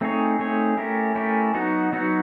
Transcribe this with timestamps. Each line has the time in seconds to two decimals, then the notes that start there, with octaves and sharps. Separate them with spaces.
0.01 A3 C4 D#4 G#4 C#5
0.39 A3 C4 D#4 G#4 C#5
0.77 A3 C#4 E4 G4 A#4
1.15 A3 C#4 E4 G4 A#4
1.54 F#3 B3 D#4 F#4
1.93 F#3 B3 D#4 F#4